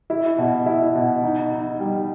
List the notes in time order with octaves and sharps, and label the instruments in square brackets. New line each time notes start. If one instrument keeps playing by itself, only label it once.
[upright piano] E4
B2
E4
B2
D#4
D#4
G3